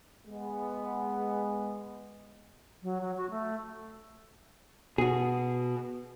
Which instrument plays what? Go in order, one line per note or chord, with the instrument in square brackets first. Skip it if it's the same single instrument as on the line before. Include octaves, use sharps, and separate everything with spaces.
[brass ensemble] G#3 B3
[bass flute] F#3
F#3
F#4
A3
[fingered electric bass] B2 [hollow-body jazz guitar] F#4 G#4